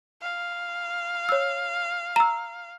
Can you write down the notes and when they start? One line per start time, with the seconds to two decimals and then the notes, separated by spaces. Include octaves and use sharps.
0.21 F5
1.29 C#5 E6
2.16 A#5 E6